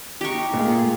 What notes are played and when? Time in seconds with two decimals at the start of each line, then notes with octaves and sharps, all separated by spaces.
0.21 D#4 G4 C#6
0.54 A#2 A3 F4 G#4